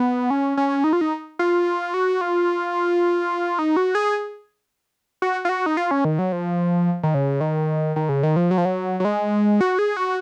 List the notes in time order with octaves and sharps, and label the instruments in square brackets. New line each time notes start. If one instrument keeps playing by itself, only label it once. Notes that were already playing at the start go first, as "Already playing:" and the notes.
Already playing: [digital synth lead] B3
C#4
C#4
D#4
F4
D#4
F4
F#4
F4
D#4
F#4
G#4
F#4
F4
F#4
D#4
F4
C#4
D#3
F#3
F3
D#3
C#3
D#3
D#3
C#3
D#3
F3
F#3
F3
F#3
F#3
G#3
F#4
G#4
F#4